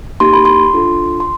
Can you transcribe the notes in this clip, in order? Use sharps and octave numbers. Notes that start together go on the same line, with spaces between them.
A#3 D#4 G4 C6
B5
C6
D4 F4 A4
C6